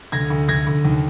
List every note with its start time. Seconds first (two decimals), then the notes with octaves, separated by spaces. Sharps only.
0.12 D2 G#6 A#6
0.30 D2
0.48 D2 G#6 A#6
0.67 D2
0.85 D#2